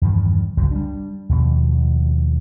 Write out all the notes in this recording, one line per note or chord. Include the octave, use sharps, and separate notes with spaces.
E2 G2 D#3 F3
G1 C#2 F#2 F#3
G3 D4
D#2 B2 F3